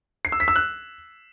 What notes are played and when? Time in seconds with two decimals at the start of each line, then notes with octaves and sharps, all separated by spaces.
0.25 C7
0.32 E6
0.40 B6
0.48 E6
0.56 F#6